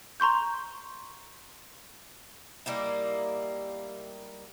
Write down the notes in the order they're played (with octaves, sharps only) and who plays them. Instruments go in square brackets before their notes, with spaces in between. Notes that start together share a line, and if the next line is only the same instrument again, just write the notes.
[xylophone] A#5 C6 C#6 G6
[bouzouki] G3 A#3 D#4 E4